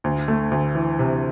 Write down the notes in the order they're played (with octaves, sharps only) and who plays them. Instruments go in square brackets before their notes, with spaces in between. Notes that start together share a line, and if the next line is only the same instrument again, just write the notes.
[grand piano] D2
A3
D2
E3
C3